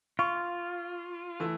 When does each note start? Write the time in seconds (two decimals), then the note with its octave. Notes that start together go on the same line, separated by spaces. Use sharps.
0.19 F4 C#6
1.40 E3 A3 E6